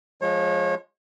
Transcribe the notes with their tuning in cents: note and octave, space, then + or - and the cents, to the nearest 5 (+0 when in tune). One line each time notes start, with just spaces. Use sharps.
F3 +0 G#3 +0 C#5 -30